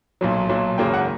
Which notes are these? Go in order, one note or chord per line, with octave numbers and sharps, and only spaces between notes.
B1 A#2 F#3
B1 A#2 F#3
G#1 F#2 C#3 F#3 A#3 G5
F#5